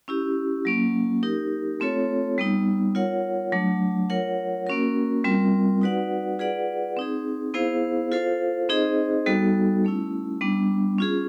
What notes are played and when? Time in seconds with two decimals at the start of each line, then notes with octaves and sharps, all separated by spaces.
0.08 C#4 E4 G4
0.65 F#3 A#3 C#4
1.23 D#4 G4 A#4
1.80 A3 C4 F4 A4 C#5
2.38 G3 B3 D#4
2.95 F4 A#4 C#5 F#5
3.52 F#3 A3 D4
4.10 F4 A#4 C#5 F#5
4.67 A#3 C#4 F#4 A#4
5.24 G3 C4 F4 A#4
5.82 D#4 F#4 B4 D5 F#5
6.39 F4 G#4 B4 D5 F#5
6.97 C4 D#4 G#4
7.54 B3 E4 G#4 C5 F5
8.12 F4 A4 C5 F5
8.69 C4 D#4 G#4 C5 D#5
9.26 G3 B3 D#4 F#4 A4
9.84 A3 C#4 E4
10.41 G3 B3 D4
10.98 C#4 F4 G#4